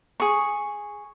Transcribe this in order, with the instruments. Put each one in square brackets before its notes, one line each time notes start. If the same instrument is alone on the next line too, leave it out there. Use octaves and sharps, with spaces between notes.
[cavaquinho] G#4 C#6